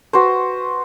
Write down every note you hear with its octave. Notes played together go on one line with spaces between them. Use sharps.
F#4 B4 C5